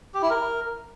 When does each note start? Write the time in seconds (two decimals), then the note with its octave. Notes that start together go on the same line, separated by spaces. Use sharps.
0.14 G4
0.22 E4
0.30 A#4